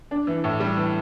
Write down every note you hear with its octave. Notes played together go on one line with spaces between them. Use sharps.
D4
E3
A2
G3
E3